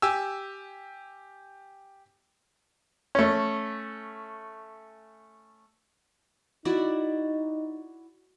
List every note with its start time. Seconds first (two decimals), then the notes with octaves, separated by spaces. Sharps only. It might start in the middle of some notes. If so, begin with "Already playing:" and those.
0.02 G4 G#5 E6
3.15 A3 C#4
6.65 D#4 E4 F#4 D5